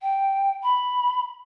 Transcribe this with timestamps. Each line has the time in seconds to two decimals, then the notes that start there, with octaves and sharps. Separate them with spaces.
0.02 G5
0.63 B5